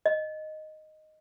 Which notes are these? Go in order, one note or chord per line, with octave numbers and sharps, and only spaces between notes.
D#5